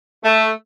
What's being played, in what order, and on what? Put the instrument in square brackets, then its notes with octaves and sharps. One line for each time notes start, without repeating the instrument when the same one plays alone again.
[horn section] A3